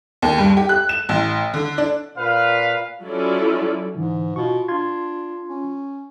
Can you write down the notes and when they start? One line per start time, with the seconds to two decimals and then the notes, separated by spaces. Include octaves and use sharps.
0.22 D#2
0.38 G2
0.57 G4
0.69 F#6
0.89 E7
1.09 A1
1.54 D3
1.78 D4
2.17 A#2 B4 F5
3.04 F#3 C#4 E4 F4 A4 D5
3.95 G#2 D3 E3
4.36 B2 F4 C#6
4.68 D4 F4 C6 G#6
5.49 C#4